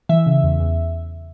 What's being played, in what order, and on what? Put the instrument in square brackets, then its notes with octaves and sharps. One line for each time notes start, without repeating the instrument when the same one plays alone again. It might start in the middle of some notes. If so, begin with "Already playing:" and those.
[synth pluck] E3 E5
C#3
E2
E2